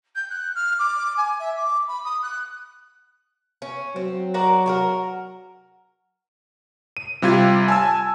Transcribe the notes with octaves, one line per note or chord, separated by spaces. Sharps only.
G6
F#6
F6
D6
G#5
E5
D6
B5
D#6
F#6
C#4
F#3 C4
F#4 A#4 D5
F#4 G4 A#4
D#7
C3 G3 F4 G4 G#6
G#5 A5 E6